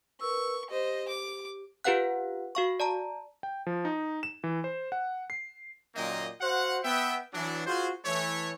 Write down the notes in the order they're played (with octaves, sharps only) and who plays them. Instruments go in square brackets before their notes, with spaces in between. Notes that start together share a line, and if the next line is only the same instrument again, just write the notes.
[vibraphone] A#4 B4 E6 [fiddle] C#6
[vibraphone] G4 [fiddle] C5 D#5
[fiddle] D6
[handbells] F4 G4 B4 F5 F#5 F#6
F#4 F5 C#6
D5 A5 A#5
[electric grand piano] G5
F3
D#4
E7
E3
C5
F#5
C7
[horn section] F#2 A#2 D#3 A#3 D#5 G5
F#4 C5 F5 F#5
B3 E5 G5
E3 F#3 D4
F4 F#4 G#4 C5
E3 A3 C#5